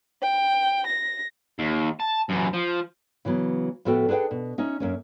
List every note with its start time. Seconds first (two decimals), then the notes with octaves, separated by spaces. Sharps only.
0.21 G5
0.86 A#6
1.59 D#2
2.00 A5
2.29 F#2 E3
2.53 F3
3.25 C#3 E3 F#3 B3
3.85 A2 F3 B3 F#4 A4 G5
4.09 D4 G#4 B4 F#5 G5
4.31 B2
4.58 C#4 D#4 E5
4.80 F#2 A#3 C#4